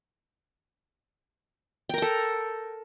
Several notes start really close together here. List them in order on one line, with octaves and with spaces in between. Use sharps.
G5 A#4 A#5 A4